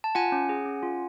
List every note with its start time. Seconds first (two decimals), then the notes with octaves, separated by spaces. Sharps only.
0.04 A5
0.15 F4 F#5 G#5
0.32 C#4
0.49 G#4
0.65 C#4
0.83 F4